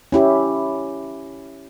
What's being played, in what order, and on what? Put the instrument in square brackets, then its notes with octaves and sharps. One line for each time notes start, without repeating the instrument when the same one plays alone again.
[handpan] C#4 E4 G4